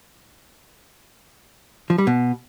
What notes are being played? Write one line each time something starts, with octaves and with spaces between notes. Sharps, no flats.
F3
G3
B2